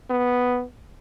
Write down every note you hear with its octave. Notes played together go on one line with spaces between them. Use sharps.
B3